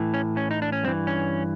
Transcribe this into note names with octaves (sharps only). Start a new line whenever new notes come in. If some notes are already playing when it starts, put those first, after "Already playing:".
Already playing: A2 E3
C#4
C#4
D#4
D4
C#4
G2 E3 C4
C#4